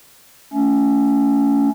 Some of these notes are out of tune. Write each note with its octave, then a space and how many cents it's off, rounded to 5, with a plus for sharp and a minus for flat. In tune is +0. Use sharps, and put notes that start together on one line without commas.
A3 +0 C#4 +20